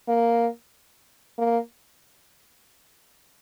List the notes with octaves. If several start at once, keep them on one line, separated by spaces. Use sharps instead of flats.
A#3
A#3